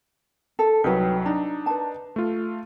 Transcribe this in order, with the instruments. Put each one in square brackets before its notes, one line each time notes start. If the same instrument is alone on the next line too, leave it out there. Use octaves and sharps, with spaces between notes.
[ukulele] A4
[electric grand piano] C2 F#3 [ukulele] D#4 G4 B4
[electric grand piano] D4 D#4 [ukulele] A#5
[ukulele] B4 A5
[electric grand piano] A3 F4